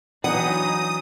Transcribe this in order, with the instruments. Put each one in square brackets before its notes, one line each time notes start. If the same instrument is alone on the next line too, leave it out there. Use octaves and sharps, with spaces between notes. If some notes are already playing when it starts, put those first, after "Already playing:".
[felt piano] E3 B3 D4 [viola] F#3 D#4 [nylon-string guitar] F#5 [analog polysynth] D#6